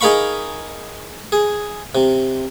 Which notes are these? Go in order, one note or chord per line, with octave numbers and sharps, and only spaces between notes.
D#4 G#4 A#4 F5 B5 C#6
G#4
C3